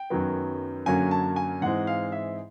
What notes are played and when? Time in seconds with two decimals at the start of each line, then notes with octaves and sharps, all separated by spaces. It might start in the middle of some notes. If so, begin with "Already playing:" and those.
Already playing: G5
0.10 F#2 D#3 F#3 B3
0.86 F#2 D3 F#3 A#3 C#4 G#5
1.11 A5
1.36 G#5
1.61 G#2 E3 G#3 C4 F#5
1.87 F5
2.12 E5